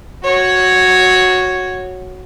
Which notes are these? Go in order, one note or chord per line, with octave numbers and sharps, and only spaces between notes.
F#4 C#5